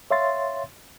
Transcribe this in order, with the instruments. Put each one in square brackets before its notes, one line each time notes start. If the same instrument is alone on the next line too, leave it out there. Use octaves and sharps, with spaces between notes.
[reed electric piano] C#5 E5 F5 C6 A6